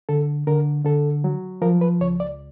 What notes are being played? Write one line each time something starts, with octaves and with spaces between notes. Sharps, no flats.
D3 A4
D3 A#4
D3 A4
F#3
F3 A#4
B4
C#2 C#5
D5